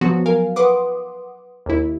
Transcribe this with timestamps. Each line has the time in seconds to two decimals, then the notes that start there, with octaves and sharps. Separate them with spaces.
0.01 F3 F#3 B3 F#4
0.26 A#4 F5 G#5
0.56 B4 F#5 C6 D6 D#6
1.66 D#2 E4